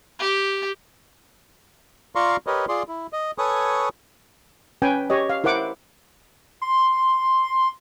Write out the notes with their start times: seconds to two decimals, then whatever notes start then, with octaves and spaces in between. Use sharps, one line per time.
0.19 G4
2.15 F4 D5 F5 A#5 C6 C#6
2.47 G4 A#4 B4 C#5 D#5
2.69 F4 G#4 D5 C6
2.88 E4
3.13 D#5
3.38 A4 B4 C#5 G#5 C#6 D#6
4.82 C#4 B4 G5 G#5
5.10 G4 C#5 D#5
5.30 F5
5.44 E4 A#4 C5 F#5 D6
6.62 C6